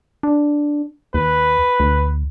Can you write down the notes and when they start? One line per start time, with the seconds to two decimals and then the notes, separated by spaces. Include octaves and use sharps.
0.23 D4
1.14 D#2 B4
1.80 D2